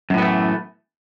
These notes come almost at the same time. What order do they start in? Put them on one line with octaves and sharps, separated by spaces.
F#2 A2 B3 A3 E3